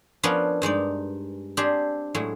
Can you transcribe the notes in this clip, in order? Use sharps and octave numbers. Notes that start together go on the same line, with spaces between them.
F3 B3 C#4 D4 A#4 B4
G2 G#3 D#4 D5
C4 D4 G4 G#4 C5
A2 F#3 G#3